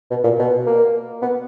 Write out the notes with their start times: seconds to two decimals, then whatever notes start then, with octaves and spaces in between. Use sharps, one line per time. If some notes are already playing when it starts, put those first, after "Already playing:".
0.10 B2
0.24 A#2
0.39 B2
0.66 A#3
1.22 B3